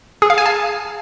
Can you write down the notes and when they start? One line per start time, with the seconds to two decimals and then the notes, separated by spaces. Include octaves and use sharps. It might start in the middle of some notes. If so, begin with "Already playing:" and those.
0.22 G#4
0.30 F5
0.38 G#5
0.46 A5